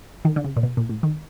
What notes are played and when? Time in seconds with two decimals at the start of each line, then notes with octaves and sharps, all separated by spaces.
0.25 D#3
0.36 D3
0.44 C#3
0.57 A#2
0.63 B2
0.77 A#2
0.89 A2
1.03 D#3